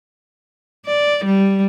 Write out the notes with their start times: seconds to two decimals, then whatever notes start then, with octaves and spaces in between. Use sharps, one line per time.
0.86 D5
1.25 G3